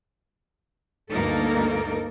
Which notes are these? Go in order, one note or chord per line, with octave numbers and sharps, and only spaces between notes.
D2 G2 A#3 D#4 A4 A#4